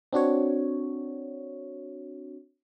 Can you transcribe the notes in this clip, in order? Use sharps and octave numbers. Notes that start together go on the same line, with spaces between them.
C4 D4 F#4 C#5